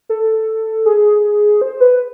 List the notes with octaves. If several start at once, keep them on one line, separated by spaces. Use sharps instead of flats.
A4
G#4
C5
B4